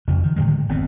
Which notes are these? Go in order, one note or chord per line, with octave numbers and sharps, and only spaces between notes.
F2 C#3 F3
D#3
A2 D3 D#3 G#3
G#1 F#2 B3 C4